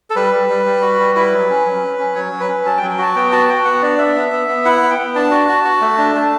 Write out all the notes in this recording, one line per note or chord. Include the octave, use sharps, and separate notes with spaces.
A4
G3 B4
G3
G3
G3
F#4
G3
E4 B4
F#3
C#4
F#3
C#4
C#4
F#3 C#5
F#3
B4
C#4
F#3 A5
G5
F#3
G5
F#4 A5
B3 G5
F#4 A5
F#4 G5
B3 F#5
D4 D5
B3 E5
B3
B3
B3
E4 F#5
B3
G5
B3
D4 A5
F#4
F#4
F#4
A3
D4
A3 A5